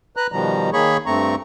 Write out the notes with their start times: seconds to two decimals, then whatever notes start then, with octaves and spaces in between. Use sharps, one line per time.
0.17 B4 A#5 F#6
0.32 B2 D#3 F3 G3 A#5
0.73 D#3 A#3 G#4 C#5 B5 C#6
1.06 G2 A3 C4 A#5 C#6